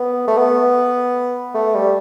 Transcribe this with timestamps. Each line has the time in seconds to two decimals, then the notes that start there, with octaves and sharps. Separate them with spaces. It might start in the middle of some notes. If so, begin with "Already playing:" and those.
Already playing: B3
0.28 A3
0.38 B3
1.54 A3
1.74 G3